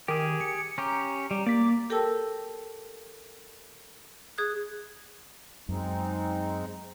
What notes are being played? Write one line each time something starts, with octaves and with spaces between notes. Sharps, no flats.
D#3 G4 G#4
C#7
C#4 G4 A#5
G3
A#3 D5 B6
G4 A4 A#4 G5 A5 E6
G#4 D#6 F#6
F#2 G#3 C4 D#4